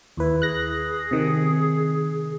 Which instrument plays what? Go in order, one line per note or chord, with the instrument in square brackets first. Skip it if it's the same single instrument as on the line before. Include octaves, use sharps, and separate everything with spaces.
[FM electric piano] D#2 B4 [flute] E4
[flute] G#4 [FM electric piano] F#6 A#6
[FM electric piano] C3 D#3